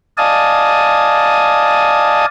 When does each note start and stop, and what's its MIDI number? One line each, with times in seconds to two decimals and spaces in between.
0.18 2.26 74
0.18 2.26 75
0.18 2.26 77
0.18 2.26 80
0.18 2.26 81
0.18 2.26 87